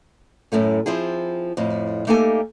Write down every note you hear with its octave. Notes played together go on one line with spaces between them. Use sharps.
F#2 A2 A3 C#4
F3 C4 E4 G#4
F2 A2
A3 A#3 D#4 G4 A4 G#5